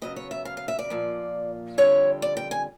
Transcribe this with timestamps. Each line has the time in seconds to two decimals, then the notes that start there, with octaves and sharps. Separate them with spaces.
0.02 C#3 F#3 B3 D#5
0.16 C#5
0.31 E5
0.45 F5
0.57 F5
0.68 E5
0.79 D5
0.90 A#2 F3 A#3
1.78 F2 D3 G3 C4 C#5
2.22 D5
2.37 G5
2.51 G#5